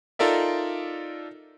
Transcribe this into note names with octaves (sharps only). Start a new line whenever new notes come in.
D#4 F4 A4 A#4 D5 E5